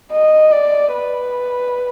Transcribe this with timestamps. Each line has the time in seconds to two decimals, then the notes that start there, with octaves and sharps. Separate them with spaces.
0.12 D#5
0.51 D5
0.93 B4